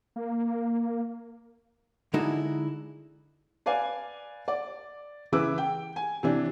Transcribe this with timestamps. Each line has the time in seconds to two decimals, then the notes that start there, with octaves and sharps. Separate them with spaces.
0.16 A#3
2.14 D3 G#3 D#4 E4 F#4 A4
3.66 B4 D5 F5 G#5
4.48 D5
5.32 C#3 E3 E4 B4 D6 E6
5.58 G5
5.96 G#5
6.23 C3 E3 D4